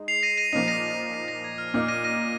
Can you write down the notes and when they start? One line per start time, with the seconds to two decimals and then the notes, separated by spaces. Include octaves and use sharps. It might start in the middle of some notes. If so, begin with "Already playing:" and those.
Already playing: G#3 D#4
0.08 C7 F7
0.23 A#6 D#7
0.38 A#6 D#7
0.53 A#2 F3 A#3 D#4 C7
0.68 A#6 D#7
1.14 C7
1.28 A#6
1.44 G#6
1.58 F6
1.74 A#2 A#3 D#4 F6
1.88 A#6 D#7
2.04 A#6 D#7